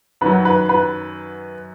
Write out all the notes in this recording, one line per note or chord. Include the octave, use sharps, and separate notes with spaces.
F#2 D#3 F#3 B4
B4
B4